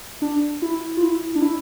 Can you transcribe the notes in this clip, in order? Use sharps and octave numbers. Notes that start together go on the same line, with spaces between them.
D4
E4
F4
E4
D4
E4